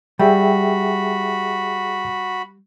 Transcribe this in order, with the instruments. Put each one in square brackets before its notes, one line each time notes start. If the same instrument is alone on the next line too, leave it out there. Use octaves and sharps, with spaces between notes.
[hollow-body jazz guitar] G3 [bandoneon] F#4 B5 [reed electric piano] G#4 E5 G5